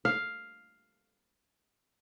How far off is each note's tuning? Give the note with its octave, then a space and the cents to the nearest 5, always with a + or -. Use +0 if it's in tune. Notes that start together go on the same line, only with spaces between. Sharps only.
F5 +5